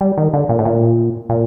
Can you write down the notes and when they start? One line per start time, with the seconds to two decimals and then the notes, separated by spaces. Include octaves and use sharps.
0.01 G3
0.18 D#3
0.33 D3
0.49 A#2
0.59 A2
0.65 A#2
1.29 A#2